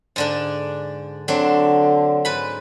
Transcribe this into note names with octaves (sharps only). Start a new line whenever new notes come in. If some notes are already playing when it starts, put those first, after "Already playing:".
G#2 D3 D4
D3 F#3 C4 D4
G#2 B4 B5